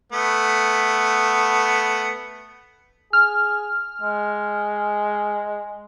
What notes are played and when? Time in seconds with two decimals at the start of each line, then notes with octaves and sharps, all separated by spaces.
0.12 A3 B3
3.13 G#4 F6
4.01 G#3